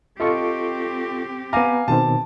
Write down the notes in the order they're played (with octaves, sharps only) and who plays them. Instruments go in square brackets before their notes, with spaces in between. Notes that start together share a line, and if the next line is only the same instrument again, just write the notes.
[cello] C4 G4 [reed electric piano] F4 A4 C#6 [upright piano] D#5
[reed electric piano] B3 A#5 [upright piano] F5 G#5 D6
[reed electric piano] B2 D#3 C4 [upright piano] A5